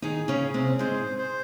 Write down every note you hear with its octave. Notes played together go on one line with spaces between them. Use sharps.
D#3 D#4 G#4
C#3 C#4
G#4
C3 C4
G#2 G#3 C5
C5